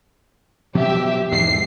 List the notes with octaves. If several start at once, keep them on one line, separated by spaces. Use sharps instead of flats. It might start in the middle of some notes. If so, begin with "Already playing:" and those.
B2 F3 F#3 G4 E5
E2 G#2 G#3 C7